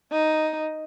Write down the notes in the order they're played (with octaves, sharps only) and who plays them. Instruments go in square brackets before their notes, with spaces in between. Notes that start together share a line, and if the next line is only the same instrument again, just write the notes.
[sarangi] D#4